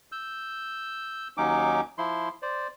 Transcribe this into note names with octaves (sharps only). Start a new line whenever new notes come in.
E6 G6
D#2 F#3 C#4 D#4 D6
F3 E4 C6
C5 D5